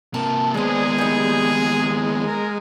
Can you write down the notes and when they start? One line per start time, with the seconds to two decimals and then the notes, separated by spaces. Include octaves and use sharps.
0.14 C3 A#3 A5
0.54 D#2 G#3 B3 G#4 C5 D5
0.98 G3 D#4
2.26 A#4